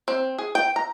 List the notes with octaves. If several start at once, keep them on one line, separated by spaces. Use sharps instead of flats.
C4
G#4
G5
A#5